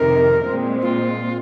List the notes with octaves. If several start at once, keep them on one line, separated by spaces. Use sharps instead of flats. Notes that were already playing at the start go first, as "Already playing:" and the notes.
Already playing: F2 C3 D#3 A#4
A#2 G#3 C4
F4